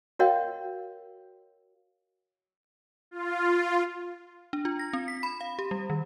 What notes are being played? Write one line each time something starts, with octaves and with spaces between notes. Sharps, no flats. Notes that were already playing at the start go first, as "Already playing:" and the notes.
F#4 A#4 C#5 D#5 F5 G5
F4
D4
F4
A#6
C4
B6
B5
F5
G4
G3
D#3